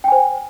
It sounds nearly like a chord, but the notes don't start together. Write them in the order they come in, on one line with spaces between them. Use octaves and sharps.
G5 G#5 C5